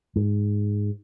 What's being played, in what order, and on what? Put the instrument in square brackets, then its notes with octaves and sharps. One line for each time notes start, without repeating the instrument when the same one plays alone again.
[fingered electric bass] G#2